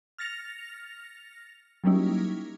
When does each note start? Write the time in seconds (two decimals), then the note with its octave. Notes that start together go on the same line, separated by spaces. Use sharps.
0.18 F6 A6 A#6 C#7 F7
1.84 F#3 G3 A#3 C#4 D#4 E4